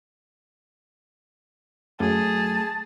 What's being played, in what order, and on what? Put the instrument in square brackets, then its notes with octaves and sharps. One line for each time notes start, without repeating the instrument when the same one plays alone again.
[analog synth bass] F#2 [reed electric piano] A3 [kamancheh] G#4 [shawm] A5